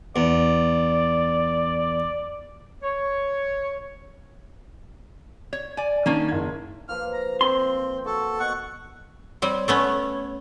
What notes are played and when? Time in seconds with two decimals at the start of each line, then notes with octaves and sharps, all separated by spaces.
0.16 E2 D5
2.83 C#5
5.53 C#5
5.77 D5 G#5
6.06 D#3 A#3 C#4 D4
6.28 F#1 G#6
6.89 F3 A#3 B4 F6
7.13 A#5
7.41 C4 C6
8.06 F#4 A4
8.40 B2 F#5 C#6
9.42 G3 C4 C#5
9.68 A3 B3 C#4